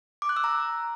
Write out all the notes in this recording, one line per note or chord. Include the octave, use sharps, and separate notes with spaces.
D6
F#6
E6
A#5